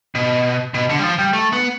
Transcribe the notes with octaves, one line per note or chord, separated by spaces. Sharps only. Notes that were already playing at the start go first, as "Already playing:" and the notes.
B2
B2
D3
G3
F3
G3
A3
B3